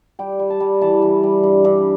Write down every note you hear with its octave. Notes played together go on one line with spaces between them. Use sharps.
G3 G5
G3
A5
G3
E3 A5
E3
G3
G2
G2